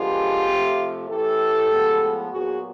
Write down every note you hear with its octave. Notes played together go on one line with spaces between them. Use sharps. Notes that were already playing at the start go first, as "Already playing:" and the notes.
Already playing: D3 F3 G#3 B3 F4 G4
C3 F3 A3
A2 E3 A3 G4 A4
A2 F3 G#3 B3
A#2 F#3 B3 F#4 G#4